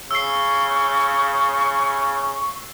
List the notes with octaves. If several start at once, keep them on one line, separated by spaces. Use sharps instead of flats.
C#3 C#6 E6 C7